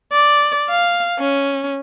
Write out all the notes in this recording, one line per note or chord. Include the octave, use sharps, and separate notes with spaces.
D5
F5
C#4